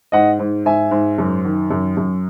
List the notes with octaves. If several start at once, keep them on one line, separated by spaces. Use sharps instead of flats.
G#2 D#5 F#5
G#2
G#2 E5 G#5
G#2
F#2
D#3
F#2
F#2